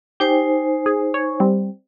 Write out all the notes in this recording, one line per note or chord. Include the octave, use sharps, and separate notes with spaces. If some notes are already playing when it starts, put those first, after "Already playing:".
D#4 G4 C5 G#5
G#4
C#5
G3 C4